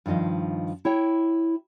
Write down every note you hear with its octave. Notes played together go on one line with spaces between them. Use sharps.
G2 D#3 F3 D#5 F5
E4 C#5 G5